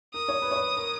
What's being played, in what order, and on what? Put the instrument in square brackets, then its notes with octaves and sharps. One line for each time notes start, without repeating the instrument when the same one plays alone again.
[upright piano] A#4 [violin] D#6
[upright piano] C#5
B4
C#5
B4
A#4